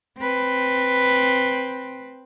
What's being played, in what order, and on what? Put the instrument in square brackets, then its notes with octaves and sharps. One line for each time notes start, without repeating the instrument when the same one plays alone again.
[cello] C4 B4